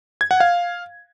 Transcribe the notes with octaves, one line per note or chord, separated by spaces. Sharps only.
G#6
F#5
F5